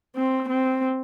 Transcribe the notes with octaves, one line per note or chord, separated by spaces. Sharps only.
C4
C4